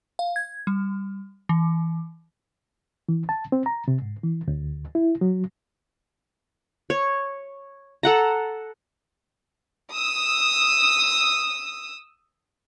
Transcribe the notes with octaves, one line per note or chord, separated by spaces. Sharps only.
F5
G#6
G3
E3
E3
A5
C4
A#5
C3
G#2
E3
D2
E4
F#3
C#5
A4 F#5 A#5
D#6 E6